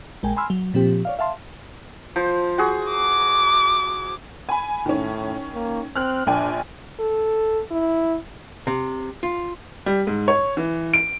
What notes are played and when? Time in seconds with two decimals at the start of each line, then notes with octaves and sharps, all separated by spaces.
0.23 A#1 G#3 A#4 G5 G#5
0.36 G#5 B5 C6 E6 F6
0.50 F#3
0.74 A#2 F3 C4 G4
1.05 C#5 D5 F5
1.19 E5 F5 A5 C6
2.16 F3 C5
2.58 F#4 G#4
2.91 D6
4.49 G#5 B5
4.86 A2 D#3 C#4
5.54 A#3
5.96 C4 F6 F#6
6.27 A#1 D4 G5 G#5
7.00 A4
7.71 E4
8.67 C3
9.23 F4
9.86 G3
10.07 G#2
10.28 C#5
10.57 E3
10.94 D7